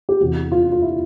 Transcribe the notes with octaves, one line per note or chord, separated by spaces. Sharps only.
G4
E2 C3 E3 F#4
F4
F4
E4